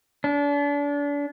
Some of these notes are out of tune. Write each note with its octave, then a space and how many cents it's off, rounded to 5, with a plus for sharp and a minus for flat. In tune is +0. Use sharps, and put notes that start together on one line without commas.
D4 -35